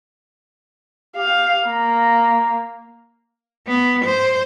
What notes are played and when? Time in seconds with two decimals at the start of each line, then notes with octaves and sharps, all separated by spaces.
1.17 G4 F5
1.66 A#3 A#5
3.68 B3
4.05 C5